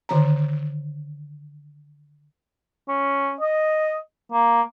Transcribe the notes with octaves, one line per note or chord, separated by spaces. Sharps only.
D3 D#3 A#5
C#4
D#5
A#3